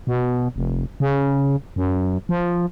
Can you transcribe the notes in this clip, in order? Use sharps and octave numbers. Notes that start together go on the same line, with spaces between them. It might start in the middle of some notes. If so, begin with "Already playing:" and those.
B2
F1
C#3
F#2
F3